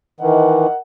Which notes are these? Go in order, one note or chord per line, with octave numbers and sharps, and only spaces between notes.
D#3 E3 A#4 D#5 F#5